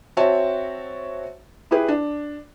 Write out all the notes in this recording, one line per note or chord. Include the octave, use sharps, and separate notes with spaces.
C4 F#4 C#5 E5 A5
E4 G4 G#4 B4
D4